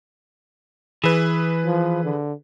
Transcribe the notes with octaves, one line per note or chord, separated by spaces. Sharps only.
E3 G#4 B4
F3
D3